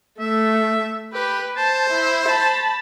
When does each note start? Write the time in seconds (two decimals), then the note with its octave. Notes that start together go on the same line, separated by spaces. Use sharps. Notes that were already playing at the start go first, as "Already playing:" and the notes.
0.20 A3 E5
1.13 G4 B4
1.57 C5 A5
1.90 E4
2.28 A5 B5